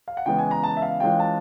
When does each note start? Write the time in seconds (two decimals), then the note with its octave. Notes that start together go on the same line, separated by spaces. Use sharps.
0.08 F5
0.17 F#5
0.26 C#3 E3 G#3 B3 G5
0.39 G#5
0.51 A#5
0.63 A5
0.77 E5
0.82 F5
1.00 E3 G#3 C#4 F4 G5
1.20 A5